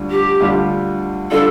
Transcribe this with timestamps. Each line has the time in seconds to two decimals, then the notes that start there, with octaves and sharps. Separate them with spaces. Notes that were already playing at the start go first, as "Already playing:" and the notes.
Already playing: D2 D3 G3 D4 F4
0.11 G4
0.41 D2 D3 G3 D4 F4
1.31 D3 G3 D4 F4 A4